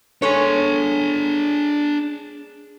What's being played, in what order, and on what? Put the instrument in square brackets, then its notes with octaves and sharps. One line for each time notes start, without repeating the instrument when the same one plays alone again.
[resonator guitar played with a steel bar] G#3 A4 C#5 [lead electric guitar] D4 G#5